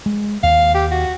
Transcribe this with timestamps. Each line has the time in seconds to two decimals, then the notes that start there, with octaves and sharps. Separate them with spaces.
0.06 G#3
0.43 D#2 F5
0.74 G4
0.91 F#4